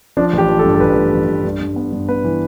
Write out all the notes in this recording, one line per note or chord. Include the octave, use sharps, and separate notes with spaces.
F3 D4
A1
G4
F3
A4
G2
A4
A1 B4
A1
A1
A1
G2
G2
B3
G2
B3 B4
E3